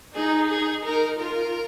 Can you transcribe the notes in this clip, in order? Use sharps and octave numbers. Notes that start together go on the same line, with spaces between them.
D#4 G#4
G#4
D#4 A#4
F4 A#4